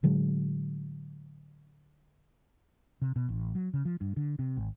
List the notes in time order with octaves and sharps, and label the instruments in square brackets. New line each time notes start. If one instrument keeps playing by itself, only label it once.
[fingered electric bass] A2 D3 F#3 G#3
[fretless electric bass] C3
B2
A1
F#3
C#3
F3
G2
D3
C3
G#1